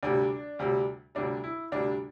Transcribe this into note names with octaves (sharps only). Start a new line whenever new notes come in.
D2 C3 G3 D4
D2 C3 G3
D2 C3 G3 D4
E4
D2 C3 G3 D4